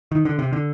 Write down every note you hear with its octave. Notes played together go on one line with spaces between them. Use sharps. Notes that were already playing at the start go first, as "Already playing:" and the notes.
D#3
D3
C3
D3